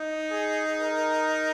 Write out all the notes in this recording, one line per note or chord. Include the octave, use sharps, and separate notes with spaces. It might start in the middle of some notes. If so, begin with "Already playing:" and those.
Already playing: D#4
G#4
A#4